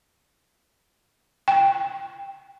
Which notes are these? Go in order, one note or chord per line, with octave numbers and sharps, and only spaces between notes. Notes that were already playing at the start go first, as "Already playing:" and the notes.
G5